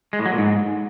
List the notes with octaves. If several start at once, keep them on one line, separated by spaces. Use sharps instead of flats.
G#3
A2
F#3
A#2
G#2